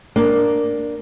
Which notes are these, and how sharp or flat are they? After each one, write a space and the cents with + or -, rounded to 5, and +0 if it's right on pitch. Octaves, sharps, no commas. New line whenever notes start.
A#3 +0 D4 +0